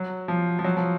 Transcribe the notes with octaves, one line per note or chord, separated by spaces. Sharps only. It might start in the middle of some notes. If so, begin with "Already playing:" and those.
Already playing: F#3
F3
F3
F#3
F3